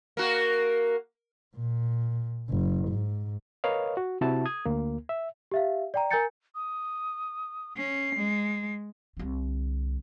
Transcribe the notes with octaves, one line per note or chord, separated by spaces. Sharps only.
A#3 F#4
A#2
F#1
G#2
A#4 B4 C#5 D#5 F5
F#4
C3 E4 F#4 A5
D#6 G#6
D2 A#3
E5
G4 E5 F5
D5 G5 A#5
A#4 G#5 A#5 G6 A6 C#7
D#6
C#4 C7
G#3
C2 D3